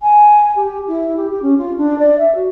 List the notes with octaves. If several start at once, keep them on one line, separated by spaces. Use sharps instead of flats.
G#5
G4
E4
G4
G4
C#4
F4
D4
D5
E5
F#4